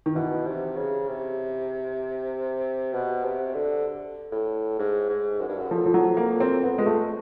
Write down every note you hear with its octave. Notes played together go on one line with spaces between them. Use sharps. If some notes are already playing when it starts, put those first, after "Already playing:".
D#3
B2 E3
C3
C#3
C3
B2
C3
D3
A2
G#2
G#2
F#2
G2
F#2
F2 F3
F3
F#3
A#3
C4
F2 B3
G#3
A3